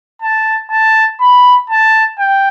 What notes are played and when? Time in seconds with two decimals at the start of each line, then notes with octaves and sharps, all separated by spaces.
0.22 A5
0.71 A5
1.21 B5
1.70 A5
2.19 G5